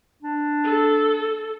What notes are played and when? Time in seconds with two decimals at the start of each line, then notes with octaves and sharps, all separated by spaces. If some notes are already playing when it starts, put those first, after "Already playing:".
0.23 D4
0.64 A4